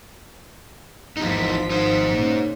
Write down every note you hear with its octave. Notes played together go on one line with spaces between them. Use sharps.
G#1 E2 F3 D#4 B6
D#4 C5
A#2 C#3